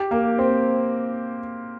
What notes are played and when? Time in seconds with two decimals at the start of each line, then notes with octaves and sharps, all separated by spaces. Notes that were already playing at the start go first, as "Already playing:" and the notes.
Already playing: G4
0.11 A#3
0.38 C4